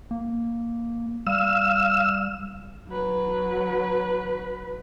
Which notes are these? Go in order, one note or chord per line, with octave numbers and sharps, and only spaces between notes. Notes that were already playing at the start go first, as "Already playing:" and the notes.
A#3
G3 F5 E6
F#3 B4